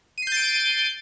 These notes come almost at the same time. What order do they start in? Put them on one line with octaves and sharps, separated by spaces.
D#7 C7 G6 A6 D7